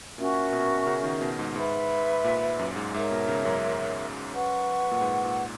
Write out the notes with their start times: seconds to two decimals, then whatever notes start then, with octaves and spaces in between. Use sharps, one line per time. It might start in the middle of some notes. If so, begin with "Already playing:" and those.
0.18 A#2 C#4 F#4 A#4 E5
0.52 B2
0.87 C#3
1.04 D#3
1.21 B2
1.39 G#2
1.56 G#2 B4 E5 B5
2.24 A#2
2.59 F#2
2.76 G#2
2.94 G#2 A#4 C#5 E5
3.11 B2
3.28 C#3
3.45 F#2
4.33 B4 F#5 C#6
4.91 A#2
5.01 G#2
5.24 A#2